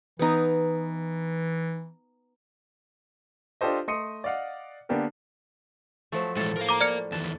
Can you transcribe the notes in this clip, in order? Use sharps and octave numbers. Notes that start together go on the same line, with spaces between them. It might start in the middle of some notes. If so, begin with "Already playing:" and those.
E3 B3 D#4
D4 F4 G4 A4 C5 D#5
A3 D#5 C6 D#6 C#7 D#7
D5 D#5 F5 F#5
D3 A#3 B3 D4 G4 A#4
F3 F#3 A3
A2 E3 G#3 A4
A#4 F5
A#5 D6
A2 D5 F6 C#7
D#2 E3 A5